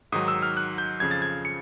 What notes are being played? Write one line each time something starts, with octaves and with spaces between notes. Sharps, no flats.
G#2 D#3 F#3 D#6
E6
F6
F#6
G6
F2 C#3 F3 G#6
A6
G#6
C#7